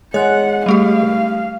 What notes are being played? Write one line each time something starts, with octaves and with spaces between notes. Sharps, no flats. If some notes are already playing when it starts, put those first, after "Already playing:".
G#3 C#5 F#5 F#6
G3 A3 G4 F5